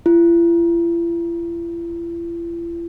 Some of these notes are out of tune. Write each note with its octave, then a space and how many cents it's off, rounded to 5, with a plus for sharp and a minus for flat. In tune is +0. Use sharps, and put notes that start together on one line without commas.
E4 +45